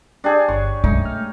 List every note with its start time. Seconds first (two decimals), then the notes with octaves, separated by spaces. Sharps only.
0.24 D4 G4 G#4
0.49 G1 C#5
0.84 B1 F#2 A3 D#4
1.05 F6